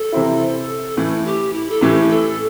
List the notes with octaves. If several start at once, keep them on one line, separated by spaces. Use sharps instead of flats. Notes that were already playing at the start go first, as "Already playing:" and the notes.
Already playing: A4
C3 E3 C4 E4
A2 E3 A3 E4
G4
E4
A4
A2 E3 A3 G4
A4